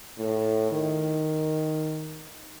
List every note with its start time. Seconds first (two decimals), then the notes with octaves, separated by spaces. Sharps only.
0.18 A2
0.71 D#3